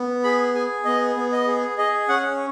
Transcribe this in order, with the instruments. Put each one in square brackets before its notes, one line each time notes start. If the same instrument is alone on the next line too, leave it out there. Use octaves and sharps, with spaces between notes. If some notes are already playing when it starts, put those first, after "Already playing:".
Already playing: [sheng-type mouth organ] B3
G#4 B5
G#4 G#5
B3 D#5
B3
D#5
G#4
G#4 D#5
C#4 F#5